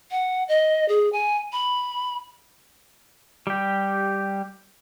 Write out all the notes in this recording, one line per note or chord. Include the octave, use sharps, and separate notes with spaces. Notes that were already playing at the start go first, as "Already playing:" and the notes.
F#5
D#5
G#4
G#5
B5
G3 G4